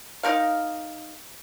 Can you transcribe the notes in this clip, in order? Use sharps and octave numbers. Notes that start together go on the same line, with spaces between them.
D#4 A#4 F5